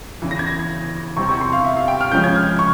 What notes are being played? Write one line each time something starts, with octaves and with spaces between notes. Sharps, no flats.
E2 C#3 E3
A#6
G#6
A#6
E2 C3 E3 G3 C4 C#6
C#6
C6
F5
E5
F5
G5
F6
C#3 F3 G#3 C#4 G6
G#6
F6
C#6